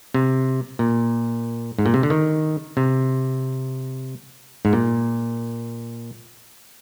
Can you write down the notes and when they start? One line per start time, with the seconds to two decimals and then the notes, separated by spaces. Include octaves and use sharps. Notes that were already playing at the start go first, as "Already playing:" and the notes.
0.14 C3
0.79 A#2
1.79 G#2
1.86 A#2
1.94 C3
2.03 D3
2.10 D#3
2.77 C3
4.65 G#2
4.73 A#2